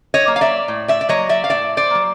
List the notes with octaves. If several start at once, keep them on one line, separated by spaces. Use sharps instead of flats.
C#5 D#5
F#3 A#3
F5
D5 E5
A2
D5 E5
D5
F#3 A#3 C#5 D#5
D5 E5
F5
A2 D5 E5
C5 D5
F#3 A#3